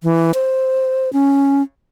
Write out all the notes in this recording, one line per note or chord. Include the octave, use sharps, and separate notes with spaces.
E3
C5
C#4